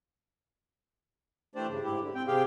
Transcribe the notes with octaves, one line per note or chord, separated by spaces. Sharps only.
E3 A3 D4 G4 C5 D5
G2 C#3
G#2 E4 G4
D3
C4 G5
C3 G4 G#4 F5 G5